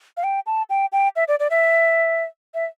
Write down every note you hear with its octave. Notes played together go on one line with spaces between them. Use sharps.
F5
G5
A5
G5
G5
E5
D5
D5
E5
E5